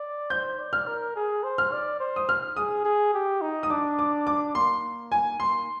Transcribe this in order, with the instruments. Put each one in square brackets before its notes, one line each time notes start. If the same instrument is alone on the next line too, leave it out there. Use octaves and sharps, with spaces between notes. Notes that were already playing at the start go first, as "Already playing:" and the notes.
Already playing: [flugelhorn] D5
[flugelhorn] C5 [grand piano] G6
[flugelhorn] D5
[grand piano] F6
[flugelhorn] A#4
G#4
C5
[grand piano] F6
[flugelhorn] D5
C5
[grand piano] D#6
F6
[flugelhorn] G#4 [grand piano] D#6
[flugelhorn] G#4
G4
D#4
[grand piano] D#6
[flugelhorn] D4 [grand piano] D6
[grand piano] D6
D6
[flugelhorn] A#3 [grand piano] C6
[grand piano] G#5
[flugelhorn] A#3 [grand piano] C6